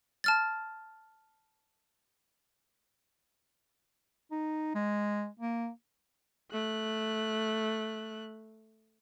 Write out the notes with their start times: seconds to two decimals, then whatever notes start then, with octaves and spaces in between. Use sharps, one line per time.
0.24 A5 F6 A6
4.31 D#4
4.75 G#3
5.40 A#3
6.52 A3 F#6